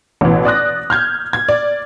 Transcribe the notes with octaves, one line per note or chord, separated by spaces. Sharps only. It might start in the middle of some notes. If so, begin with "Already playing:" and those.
A1 B2 E3
D5 D#6 F#6 A#6
F6 G6 G#6
G#6
D5